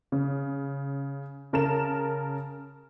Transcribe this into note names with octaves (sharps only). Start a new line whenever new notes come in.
C#3
C#3 A#4 A5 E7